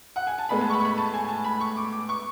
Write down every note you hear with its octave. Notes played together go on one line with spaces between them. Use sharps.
F#5
G#5
A5
A2 G#3 B3 B5
A5
C#6
B5
C#6
B5
A5
G#5
A5
B5
C#6
D6
D6
C#6